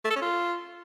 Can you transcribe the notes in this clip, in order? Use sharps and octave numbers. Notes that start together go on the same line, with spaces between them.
A3
A4
C#4
F4